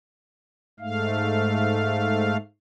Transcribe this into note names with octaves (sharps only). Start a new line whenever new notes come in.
G#2 A3 F5